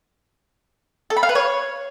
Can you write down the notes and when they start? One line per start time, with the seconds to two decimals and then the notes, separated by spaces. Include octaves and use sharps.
1.10 A4
1.17 B5
1.23 F5
1.29 B4
1.35 C#5